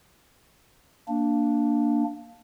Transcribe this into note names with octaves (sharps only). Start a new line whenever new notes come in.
A#3 D4